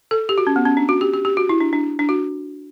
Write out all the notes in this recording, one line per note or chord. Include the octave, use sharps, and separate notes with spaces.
A4
G4
F#4
C#4
B3
C#4
D4
F#4
G4
G4
G4
F#4
E4
D4
D4
D4
F#4